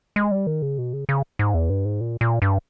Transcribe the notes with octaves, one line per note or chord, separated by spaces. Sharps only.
G#3
G3
D#3
C#3
B2
C#3
C#3
G#2
E2
G2
G#2
A#2
A#2
G2